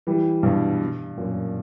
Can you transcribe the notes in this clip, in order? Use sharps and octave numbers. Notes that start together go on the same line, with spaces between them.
E3 G3
G2 B2
F#2 A#2